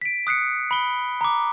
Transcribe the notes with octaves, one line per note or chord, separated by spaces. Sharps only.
B6 D7
D#6 F#6 C7 C#7
B5 G7
A#5 D6